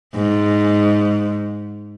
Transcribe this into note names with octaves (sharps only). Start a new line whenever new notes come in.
G#2